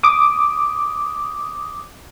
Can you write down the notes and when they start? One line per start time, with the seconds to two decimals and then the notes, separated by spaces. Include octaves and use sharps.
0.03 D6 D#6